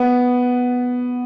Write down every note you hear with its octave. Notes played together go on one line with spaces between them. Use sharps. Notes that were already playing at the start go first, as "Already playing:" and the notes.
Already playing: B3